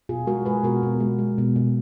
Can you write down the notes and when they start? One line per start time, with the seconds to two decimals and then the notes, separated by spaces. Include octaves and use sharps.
0.09 B2 F4 G#4
0.27 G#3 F#4 A#4
0.45 G#3 G#4 B4
0.64 B2 F#4 A#4
0.83 B2
1.00 G#3
1.19 G#3
1.38 B2
1.56 B2